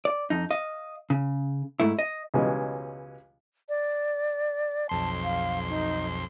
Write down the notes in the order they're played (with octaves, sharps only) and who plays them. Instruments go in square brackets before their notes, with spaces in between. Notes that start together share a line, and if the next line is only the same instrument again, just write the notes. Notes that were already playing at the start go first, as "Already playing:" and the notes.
[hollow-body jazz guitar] D5
F2 D#4
D#5 F5
C#3
G#2 A3 E4
D#5
[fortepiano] C#2 B2 E3 G3 G#3 C#4
[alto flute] D5
[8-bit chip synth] B1 F2 C6 [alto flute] A5
[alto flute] F5
D#4